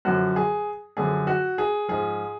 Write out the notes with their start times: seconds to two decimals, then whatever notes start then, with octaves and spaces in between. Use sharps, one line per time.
0.05 F#2 D3 F3 F#4
0.36 G#4
0.97 F#2 D3 F3 G#4
1.27 F#4
1.58 G#4
1.88 G#2 F3 G#4